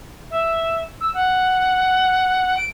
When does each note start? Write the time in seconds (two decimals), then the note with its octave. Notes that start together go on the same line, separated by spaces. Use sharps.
0.31 E5
1.01 E6
1.14 F#5
2.57 D7